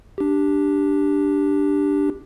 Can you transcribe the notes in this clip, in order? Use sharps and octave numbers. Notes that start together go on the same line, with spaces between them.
D4 G4